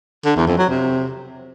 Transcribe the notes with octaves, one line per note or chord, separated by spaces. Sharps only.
D3
E2
F2
F#3
C3